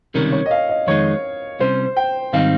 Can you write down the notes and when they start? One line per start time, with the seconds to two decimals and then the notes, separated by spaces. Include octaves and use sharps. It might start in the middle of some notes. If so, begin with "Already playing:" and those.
0.14 C#2 C3 D#3 G3 C#4 A#4
0.32 C#5
0.46 D#5
0.51 F5
0.69 D#5
0.87 F2 D#3 G#3 D#4 C#5
1.59 C2 C3 G3 C#4 C5
1.96 G5
2.33 G#2 D#3 G3 C4 D#4 F5